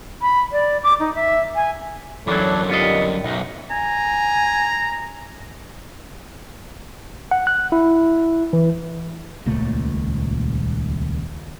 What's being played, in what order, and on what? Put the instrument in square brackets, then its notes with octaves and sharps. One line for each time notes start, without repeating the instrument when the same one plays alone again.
[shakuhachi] B5
D5
D6
D#4
E5
G#5
[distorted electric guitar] F#2 D3 [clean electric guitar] E3 F#3 [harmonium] A4 C#5 D5
[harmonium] D#3 G3 [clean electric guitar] B3 F4 D#5
[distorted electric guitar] B1 [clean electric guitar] D#4 [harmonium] E5
[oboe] G#5 [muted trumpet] A#5
[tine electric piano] F#5
F#6
E4
E3
[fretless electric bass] D#1 C#2 A#2 A3